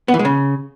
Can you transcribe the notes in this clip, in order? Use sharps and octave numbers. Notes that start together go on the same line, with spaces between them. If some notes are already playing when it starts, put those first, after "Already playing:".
B3
E3
G#3
C#3